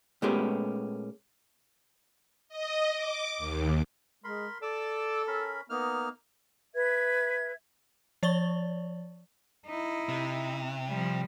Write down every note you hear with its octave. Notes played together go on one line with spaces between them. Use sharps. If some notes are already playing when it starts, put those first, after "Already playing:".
A#2 G#3 A3 B3 C#4 G4
D#5
D6
D#2
G#3 A#4 B5 C6
A4 D5 D6 E6
C#4 A#4 B5
A#3 B3 D#4 F6
B4 E5 G#6
F3 C#5 D5 C#6 A6 G7
D#4 E4
C3
F3 G3